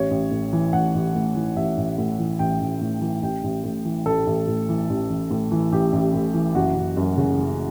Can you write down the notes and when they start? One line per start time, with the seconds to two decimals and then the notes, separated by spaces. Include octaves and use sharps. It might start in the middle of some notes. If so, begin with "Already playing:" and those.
Already playing: A1 C#5
0.11 A1
0.32 A2
0.53 E3
0.73 A1 F#5
0.94 A1
1.15 A2
1.36 E3
1.57 A1 E5
1.78 A1
1.98 A2
2.19 E3
2.39 A1 G5
2.61 A1
2.81 A2
3.01 E3
3.23 A1 G5
3.44 A1
3.64 A2
3.85 E3
4.06 A1 A4
4.27 A1
4.47 A2
4.69 E3
4.90 A1
5.10 A1
5.31 A2
5.51 E3
5.72 A1 G4
5.93 A1
6.14 A2
6.34 E3
6.55 F#1 F#4
6.76 F#1
6.97 F#2
7.18 C#3
7.38 F#1